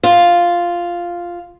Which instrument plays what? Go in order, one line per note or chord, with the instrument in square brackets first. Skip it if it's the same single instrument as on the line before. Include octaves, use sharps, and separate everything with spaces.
[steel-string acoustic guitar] F4